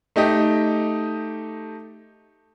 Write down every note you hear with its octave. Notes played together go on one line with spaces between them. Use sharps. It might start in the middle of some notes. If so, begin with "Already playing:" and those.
A3 D#4 G4 D#5